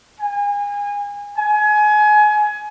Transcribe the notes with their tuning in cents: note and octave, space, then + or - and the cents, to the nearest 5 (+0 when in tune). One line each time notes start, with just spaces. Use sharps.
G#5 -30
G#5 +25